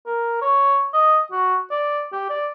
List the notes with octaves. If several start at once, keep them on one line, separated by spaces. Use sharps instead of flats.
A#4
C#5
D#5
F#4
D5
G4
D5